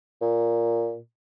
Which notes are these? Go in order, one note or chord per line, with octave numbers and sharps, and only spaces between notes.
A#2